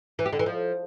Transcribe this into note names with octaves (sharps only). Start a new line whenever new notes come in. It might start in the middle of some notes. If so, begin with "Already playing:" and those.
E3
G4
D3
E3
F3